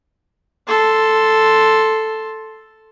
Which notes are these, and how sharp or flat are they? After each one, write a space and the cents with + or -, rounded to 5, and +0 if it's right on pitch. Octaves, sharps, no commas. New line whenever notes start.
A4 +0 C6 +0